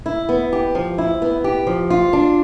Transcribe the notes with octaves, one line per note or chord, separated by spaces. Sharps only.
E4
B3
G4
F3
E4
B3
G4
F3
F4
D4